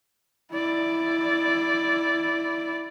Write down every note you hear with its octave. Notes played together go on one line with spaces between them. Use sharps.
E4 D5